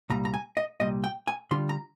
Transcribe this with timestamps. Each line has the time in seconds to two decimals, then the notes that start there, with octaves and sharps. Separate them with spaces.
0.10 C2 A#2 G3 A#5
0.25 A#5
0.34 G#5
0.57 D#5
0.80 C2 A#2 G3 D#5
1.04 G5
1.27 G#5
1.51 D3 G3 D4 F4 C6
1.69 A#5